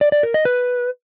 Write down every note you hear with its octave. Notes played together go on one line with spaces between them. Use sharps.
D5
D5
A#4
D#5
B4